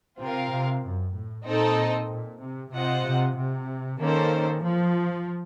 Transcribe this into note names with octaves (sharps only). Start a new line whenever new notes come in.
C3 C4 F4 A#4 F5
C3
F#2
A2
A#2 C4 D#4 A4 D#5
A#2
C3
C3 F4 C5 D#5 F#5
C3
C3
D#3 A#3 C#4 A4 C5
F3